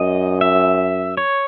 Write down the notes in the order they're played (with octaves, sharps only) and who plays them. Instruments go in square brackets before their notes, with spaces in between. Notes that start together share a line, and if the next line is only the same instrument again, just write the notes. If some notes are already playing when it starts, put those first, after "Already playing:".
Already playing: [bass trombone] F#2 [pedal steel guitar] D#5
[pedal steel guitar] E5
C#5